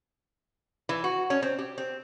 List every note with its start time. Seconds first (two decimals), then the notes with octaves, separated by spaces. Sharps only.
0.89 E3
1.04 F#4
1.30 C#4
1.42 C4
1.59 G4
1.78 C4